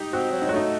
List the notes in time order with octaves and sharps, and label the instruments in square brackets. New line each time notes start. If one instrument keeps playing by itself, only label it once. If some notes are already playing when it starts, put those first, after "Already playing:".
Already playing: [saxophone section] D#4 [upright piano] G4
[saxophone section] C4 [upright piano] F#4
[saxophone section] F#3
[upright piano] D#4
[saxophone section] A3 [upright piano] F#4
[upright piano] D#4